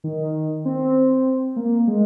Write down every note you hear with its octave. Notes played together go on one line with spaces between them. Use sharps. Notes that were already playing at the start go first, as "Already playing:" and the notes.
D#3
C4
A#3
G#3